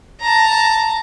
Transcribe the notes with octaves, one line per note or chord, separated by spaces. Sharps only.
A5 A#5